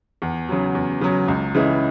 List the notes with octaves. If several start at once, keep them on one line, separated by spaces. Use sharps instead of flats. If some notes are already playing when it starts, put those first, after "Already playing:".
E2
C#3 F#3
E2
C#3 F#3
C#2
C#3 E3 G#3 E4